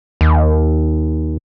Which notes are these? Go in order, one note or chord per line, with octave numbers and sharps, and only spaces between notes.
D#2